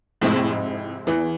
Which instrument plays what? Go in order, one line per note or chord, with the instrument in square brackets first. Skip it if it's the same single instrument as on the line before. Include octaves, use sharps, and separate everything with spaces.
[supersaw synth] F2 C3 G#3 C4 E4 [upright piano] A2
[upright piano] A2
G#2
[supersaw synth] E2 [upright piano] E3